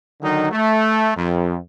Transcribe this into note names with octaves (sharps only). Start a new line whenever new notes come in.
D3 D#3 F#3 D#4
A3
F2